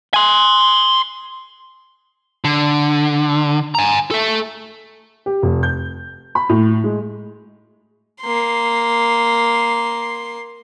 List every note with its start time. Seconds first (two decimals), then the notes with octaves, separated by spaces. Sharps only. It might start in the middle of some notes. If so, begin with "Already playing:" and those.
0.14 G#5 C6
2.44 D3
3.75 G#5 A#5
4.11 A4 E5
5.26 G4
5.42 F1
5.63 G6
6.35 B5
6.49 A2
6.84 G#3
8.21 A#3 C6